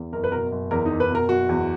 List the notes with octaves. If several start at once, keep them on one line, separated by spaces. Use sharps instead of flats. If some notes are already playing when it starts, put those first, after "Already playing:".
Already playing: E2
F#1 A#4
B4
B2 A#4
F#1
E2 A#4
F#1 D#4
B4
B2 A#4
F#1 F#4
E2